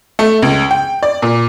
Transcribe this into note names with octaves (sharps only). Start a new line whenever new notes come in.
A3
C#2
G5
D5
A#2